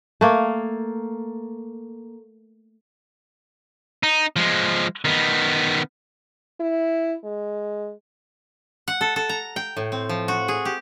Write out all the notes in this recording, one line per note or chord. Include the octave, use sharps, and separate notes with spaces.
A3 A#3
D#4
F3 G#3
D#3 B3
E4
G#3
F#5
A4
A4
A#5
G5
A2
C4
F3
F#4
G#4
G4